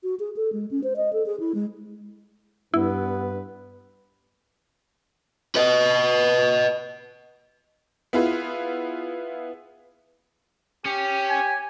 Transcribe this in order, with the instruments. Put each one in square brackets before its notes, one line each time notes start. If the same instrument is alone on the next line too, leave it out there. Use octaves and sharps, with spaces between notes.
[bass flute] F#4
G#4
A4
G#3
C#4
C5
D#5
A4
G#4
E4
G#3
[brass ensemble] G2 [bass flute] B3 [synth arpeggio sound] E4 [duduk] B4
[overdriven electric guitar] B4 D#5
[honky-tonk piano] B3 E4 F4 G#4 B4
[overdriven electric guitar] C#4 [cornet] G4
[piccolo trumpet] G#5